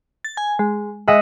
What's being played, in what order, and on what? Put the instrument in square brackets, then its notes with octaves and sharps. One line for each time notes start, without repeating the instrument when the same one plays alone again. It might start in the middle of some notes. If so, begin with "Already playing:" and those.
[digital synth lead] A6
G#5
G#3
[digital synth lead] G#3 [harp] D#5 E5 F#5